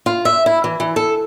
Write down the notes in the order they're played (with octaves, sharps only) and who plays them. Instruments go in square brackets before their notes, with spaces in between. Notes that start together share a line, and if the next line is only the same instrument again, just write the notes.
[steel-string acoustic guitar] F4
E5
E4
E3
E3
A4